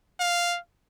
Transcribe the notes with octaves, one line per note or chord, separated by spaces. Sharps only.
F5